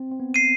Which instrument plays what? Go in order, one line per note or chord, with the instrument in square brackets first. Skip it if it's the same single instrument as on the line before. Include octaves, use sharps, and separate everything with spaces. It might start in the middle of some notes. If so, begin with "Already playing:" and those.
Already playing: [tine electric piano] C4
C4
B3
[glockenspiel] C7 D#7